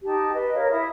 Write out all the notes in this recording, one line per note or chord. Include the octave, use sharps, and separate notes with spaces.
D#4 G4 A5
B4 D#5
A#4 C#5 F5
E4 E5 D#6